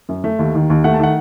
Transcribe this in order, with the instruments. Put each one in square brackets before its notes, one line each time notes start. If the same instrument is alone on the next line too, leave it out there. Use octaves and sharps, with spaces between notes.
[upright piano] F#2
A3
D#2
D#3
D#2
A3 F#5
A5
D#3 F#5